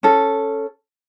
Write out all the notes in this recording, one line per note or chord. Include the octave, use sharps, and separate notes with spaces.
C#4 A4